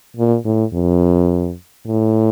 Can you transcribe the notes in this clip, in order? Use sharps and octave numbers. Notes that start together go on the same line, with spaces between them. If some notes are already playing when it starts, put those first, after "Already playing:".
A#2
A2
F2
A2